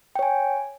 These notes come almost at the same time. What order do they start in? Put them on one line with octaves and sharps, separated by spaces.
G5 C#5 G#5